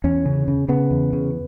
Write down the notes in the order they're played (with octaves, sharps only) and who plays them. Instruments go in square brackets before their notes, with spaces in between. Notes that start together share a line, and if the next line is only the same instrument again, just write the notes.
[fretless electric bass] E2 C#4
C#3
C#3
C#3 B3
E2
C#3